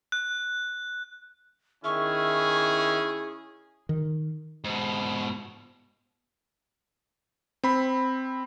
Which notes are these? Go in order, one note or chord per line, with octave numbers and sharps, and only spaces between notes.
F#6
D#3 C#4 E4 G#4 E5 C#6 F6
D#3
G#2 B2
C4 B5